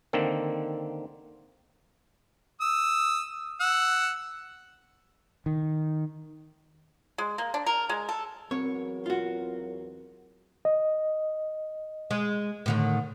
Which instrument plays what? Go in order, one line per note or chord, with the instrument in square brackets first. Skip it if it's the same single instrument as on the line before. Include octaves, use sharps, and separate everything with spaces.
[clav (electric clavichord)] D3 D#3 A#3 C4
[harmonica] D#6 E6
F#5 E6
[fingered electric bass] D#3
[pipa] G#3
A#3
D4
A#4
G#3
A4
[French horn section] E2 F#3 A#4 [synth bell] C4 [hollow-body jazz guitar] C#5
[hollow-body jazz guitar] F4 F#4
[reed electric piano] D#5
[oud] G#3
A2 D3 D#3